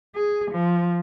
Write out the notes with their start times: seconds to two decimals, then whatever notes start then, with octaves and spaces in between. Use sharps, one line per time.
0.16 G#4
0.52 F3